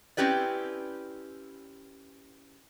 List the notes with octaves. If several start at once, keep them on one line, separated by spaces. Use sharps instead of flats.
C4 C#4 E4 G4 B4 D5